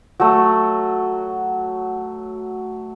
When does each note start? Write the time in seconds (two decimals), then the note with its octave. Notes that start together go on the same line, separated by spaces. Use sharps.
0.20 F#3 A3